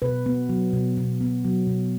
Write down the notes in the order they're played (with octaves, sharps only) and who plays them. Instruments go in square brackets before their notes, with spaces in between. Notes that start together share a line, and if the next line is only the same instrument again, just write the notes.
[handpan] B2 B4
B3
F#3
B2
B2
B3
F#3
B2